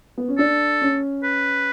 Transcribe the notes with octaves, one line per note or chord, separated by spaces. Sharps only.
B3
C#4
D4 A4
C#4
B4